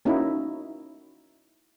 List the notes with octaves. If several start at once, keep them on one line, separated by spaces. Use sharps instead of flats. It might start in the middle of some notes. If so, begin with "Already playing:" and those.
A#3 C#4 D#4 E4 F#4